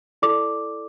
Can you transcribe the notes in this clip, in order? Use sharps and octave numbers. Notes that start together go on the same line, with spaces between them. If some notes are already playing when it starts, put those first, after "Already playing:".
E4 A4 D5 D6